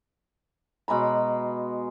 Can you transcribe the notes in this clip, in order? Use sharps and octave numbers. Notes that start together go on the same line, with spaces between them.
B2 G#3 A#5 B5